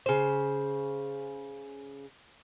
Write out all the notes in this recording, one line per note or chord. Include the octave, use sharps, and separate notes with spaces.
C#3 C5